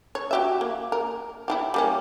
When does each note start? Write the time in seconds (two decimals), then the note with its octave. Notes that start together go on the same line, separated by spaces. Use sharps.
0.15 C#5
0.31 F#4 G4 E5
0.61 A#3
0.92 A#4
1.48 E4 F4 G4
1.74 G3 A#3 C#4